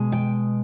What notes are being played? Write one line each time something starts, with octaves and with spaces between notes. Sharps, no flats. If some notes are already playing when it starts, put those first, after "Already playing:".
Already playing: B2 G#3
G5